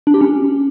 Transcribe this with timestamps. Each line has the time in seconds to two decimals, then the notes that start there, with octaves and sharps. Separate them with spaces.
0.07 D4
0.14 G4
0.21 C#4